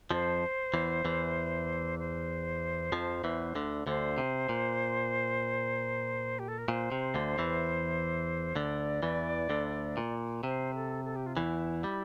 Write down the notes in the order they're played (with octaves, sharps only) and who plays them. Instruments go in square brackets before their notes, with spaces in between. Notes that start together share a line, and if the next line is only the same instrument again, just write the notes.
[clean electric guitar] F2 F3 [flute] C5
[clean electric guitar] E2 E3
E2 E3
[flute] C5
[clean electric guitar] F2 F3
E2 E3
D2 D3
[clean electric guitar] D2 D3 [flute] C5
[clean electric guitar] C3
A#2
[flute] G4
A4
A#4
[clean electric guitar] A#2 [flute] C5
[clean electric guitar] C3
D2 D3
E2 E3
[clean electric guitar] D2 D3 [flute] D5
[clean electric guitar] E2 E3
D2 D3
A#2
[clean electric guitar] C3 [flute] C5
[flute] A4
A4
G4
F4
[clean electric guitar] E2 E3 [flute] E4
[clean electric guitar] G3